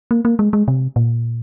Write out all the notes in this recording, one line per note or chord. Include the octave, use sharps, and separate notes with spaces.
A#3
A#3
G#3
G#3
C3
A#2